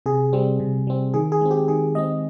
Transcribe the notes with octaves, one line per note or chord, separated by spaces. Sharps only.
C3 G#4
G3 C4
C3
G3 C4
D#3 G#4
G#4
G#3 C4
G4
D#3 G#4
G#3 C4 D#5